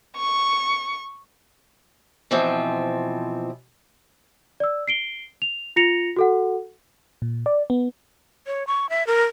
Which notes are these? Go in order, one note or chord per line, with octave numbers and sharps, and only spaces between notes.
C#6
B2 E3 F3 C4
D5 E6
C7 D7 G7
F7
F4 A#6 C#7 F7
F#4 A4 F#5
A#2
D5
B3
C#5
C#6
E5
A#4